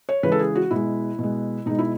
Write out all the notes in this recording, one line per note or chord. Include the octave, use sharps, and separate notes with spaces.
C#5
C#3 E3 G#3 B4
A4
G#4
F#4
B2 G#3 E4
B2 G#3
B2 G#3 D#4
E4